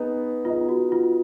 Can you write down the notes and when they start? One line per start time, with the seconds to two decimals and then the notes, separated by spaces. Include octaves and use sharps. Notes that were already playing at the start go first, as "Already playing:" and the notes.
Already playing: B3 D#4 G#4 B4
0.45 B3 D#4 F4 G#4 D#5
0.69 F#4
0.92 F4